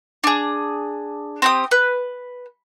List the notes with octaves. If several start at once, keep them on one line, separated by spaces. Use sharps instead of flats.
D4 G#4
C4 G4 D#6
B4